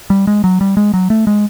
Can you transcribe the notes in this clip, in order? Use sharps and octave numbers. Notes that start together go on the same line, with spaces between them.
G3
G#3
F#3
G3
G#3
F#3
A3
G#3